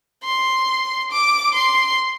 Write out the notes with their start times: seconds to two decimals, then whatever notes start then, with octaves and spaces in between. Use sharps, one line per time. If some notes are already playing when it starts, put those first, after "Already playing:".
0.23 C6
1.11 D6
1.54 C6